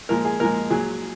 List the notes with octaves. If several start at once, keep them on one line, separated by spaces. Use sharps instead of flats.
A#2 F3 G#3 A#4
G#4
A#2 F3 G#3 A#4
A#2 F#3 G#4